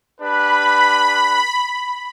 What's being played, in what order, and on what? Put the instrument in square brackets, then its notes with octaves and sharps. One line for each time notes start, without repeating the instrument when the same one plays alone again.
[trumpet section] D4 G4 B4 [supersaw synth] B5